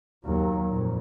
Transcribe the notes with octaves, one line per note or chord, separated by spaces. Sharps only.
D#2 F#3
F2 A#2